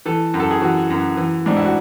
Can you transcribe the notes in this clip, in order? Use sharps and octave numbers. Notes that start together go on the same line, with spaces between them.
E3 A4
F#2
A4
G#4
E3 F#4
F#2
E3
G#2 D4
E4
F#4